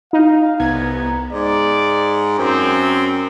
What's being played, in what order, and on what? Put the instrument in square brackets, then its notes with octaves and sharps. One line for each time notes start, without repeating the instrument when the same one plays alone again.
[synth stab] D#4 [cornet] F5
[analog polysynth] C2 B3 [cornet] A#5 [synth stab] G#6
[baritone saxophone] G#2 [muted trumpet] D5
[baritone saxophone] F#2 [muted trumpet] C4